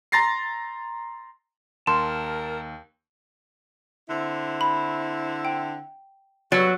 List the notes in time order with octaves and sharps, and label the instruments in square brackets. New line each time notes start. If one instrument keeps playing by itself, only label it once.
[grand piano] A#5 C6 A6 A#6 C7
[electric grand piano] D#2 [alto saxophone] A#4 [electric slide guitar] A5 [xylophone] C6
[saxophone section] D3 C4 E4
[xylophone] B5
G5
[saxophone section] G2 B3 F#4 [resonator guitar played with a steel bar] F#3 [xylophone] E6 A6